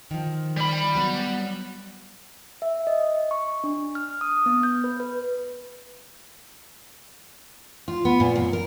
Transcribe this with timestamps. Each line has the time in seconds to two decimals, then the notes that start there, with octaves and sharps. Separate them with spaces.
0.11 D#3 F3
0.57 G3 B5
0.95 F#3 B3 F#4
2.62 E5
2.87 D#5
3.31 C#6
3.64 D4
3.95 F6
4.21 D#6
4.46 B3
4.63 G6
4.84 B4
5.00 B4
7.88 F4
8.05 B3
8.20 A#2
8.36 F#2
8.53 A#4